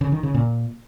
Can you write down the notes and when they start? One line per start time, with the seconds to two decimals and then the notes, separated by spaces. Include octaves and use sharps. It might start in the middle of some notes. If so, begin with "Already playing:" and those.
0.01 C#3
0.12 D#3
0.23 C#3
0.34 A#2